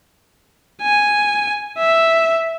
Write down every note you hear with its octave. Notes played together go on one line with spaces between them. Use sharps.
G#5
E5